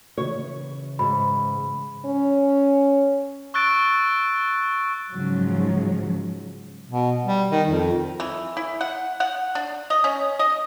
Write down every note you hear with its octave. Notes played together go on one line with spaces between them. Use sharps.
C#3 E3 C#5
G#2 B5
C#4
C#6 E6 F#6 A6 D7
G#2 C#3 F3 F#3
B2
G3
D#3
F2
E3
E4
F#5
F#5
D4
D#5
C#4
D#5